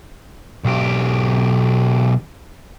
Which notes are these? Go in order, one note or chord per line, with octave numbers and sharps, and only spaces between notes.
B1 G4